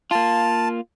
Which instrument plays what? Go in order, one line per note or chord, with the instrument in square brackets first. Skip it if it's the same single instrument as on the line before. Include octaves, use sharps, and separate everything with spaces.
[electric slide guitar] A#3 F4 [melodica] A5